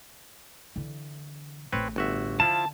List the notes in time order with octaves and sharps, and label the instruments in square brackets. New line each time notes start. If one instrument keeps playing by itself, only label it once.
[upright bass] D3 E3
[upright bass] A1 A2 [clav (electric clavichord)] C4 B4 C#5
[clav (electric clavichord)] G1 F#4 E5
[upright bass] D3 [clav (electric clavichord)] F3 E4 F4 [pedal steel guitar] A5